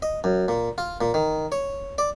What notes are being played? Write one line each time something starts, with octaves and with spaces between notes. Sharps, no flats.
D#5
F#2
A#2
F4
A#2
D#3
C#5
D5